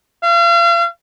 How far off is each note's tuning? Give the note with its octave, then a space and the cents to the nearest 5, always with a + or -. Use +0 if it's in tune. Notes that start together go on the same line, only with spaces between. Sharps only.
F5 -40